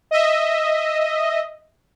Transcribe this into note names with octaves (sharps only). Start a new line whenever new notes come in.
D#5 E5